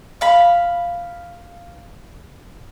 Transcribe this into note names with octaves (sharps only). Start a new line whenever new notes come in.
F5 B5